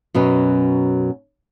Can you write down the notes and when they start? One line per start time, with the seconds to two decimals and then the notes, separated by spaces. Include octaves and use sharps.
0.14 F#2 B2 F#3 C#4